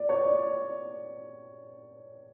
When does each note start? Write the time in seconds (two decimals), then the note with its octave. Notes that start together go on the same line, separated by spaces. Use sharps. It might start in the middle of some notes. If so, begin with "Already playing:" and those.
Already playing: D5
0.09 C#5
0.25 D5